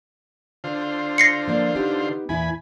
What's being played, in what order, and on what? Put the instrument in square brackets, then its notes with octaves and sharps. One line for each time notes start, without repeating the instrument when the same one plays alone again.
[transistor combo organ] D3 F4 C5
[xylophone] A#6 C7 C#7
[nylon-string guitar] F3 A#3 D5
B3 D#4 G4
[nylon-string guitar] E2 A#2 E4 [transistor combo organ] G#5 B5